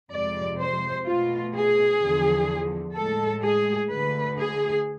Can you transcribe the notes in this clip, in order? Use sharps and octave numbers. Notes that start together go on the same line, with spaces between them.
F2 C3 G#3 D5
C5
B2 A3 F4
G#4
E2 D3 F3
A2 G#3 A4
G#4
D2 D3 A3 B4
G#4